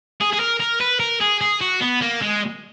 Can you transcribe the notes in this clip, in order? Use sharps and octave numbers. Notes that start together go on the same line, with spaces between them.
G#4
G#4
A#4
A#4
B4
A#4
G#4
G#4
F#4
B3
A#3
G#3